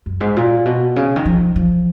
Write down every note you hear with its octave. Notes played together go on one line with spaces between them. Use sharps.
F#2
G#2
A#2
B2
C#3
D#3
F3
F3